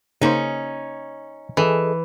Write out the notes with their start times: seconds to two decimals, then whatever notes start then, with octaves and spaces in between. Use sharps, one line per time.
0.22 C#3 A#3 C#4 D#4 C5
1.57 E3 G#4 A4 D#5